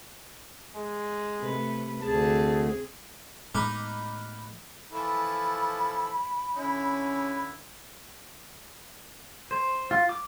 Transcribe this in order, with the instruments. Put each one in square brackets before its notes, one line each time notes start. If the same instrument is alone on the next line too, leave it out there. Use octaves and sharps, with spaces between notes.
[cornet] G#3
[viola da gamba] C3 A3 B4
[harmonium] D2 [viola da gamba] C4 G#4 [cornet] A5
[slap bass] A2 G#3 B3 [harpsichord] D#4 [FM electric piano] B5 F6 F#6 [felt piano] D6
[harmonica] E3 F3 A4 [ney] B5
[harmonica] D3 E4 [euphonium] C#4
[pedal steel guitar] C5
F4
D6